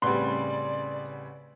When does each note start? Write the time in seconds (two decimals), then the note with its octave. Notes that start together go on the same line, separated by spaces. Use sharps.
0.02 A1 C#3 G3 C4 B4 D5 F#5 C6